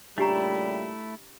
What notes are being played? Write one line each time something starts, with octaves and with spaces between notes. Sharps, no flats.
A#2 C#3 G3 A3 D4 E4 G4 A#5